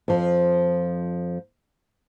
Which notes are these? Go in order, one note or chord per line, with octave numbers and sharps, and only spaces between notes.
F2 F3